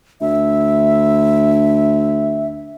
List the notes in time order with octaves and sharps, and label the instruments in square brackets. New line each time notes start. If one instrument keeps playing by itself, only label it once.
[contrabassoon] D2 [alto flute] E5